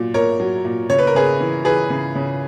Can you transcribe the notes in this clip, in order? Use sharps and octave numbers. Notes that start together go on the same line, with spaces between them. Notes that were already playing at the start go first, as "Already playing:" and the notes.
Already playing: A#2 F#3
A#2 A#4 C#5
F#3
A#2
C#3 C#5
B4
A#4
C#3 G#4 B4
E3
E3 G#4 B4
C#3
C#3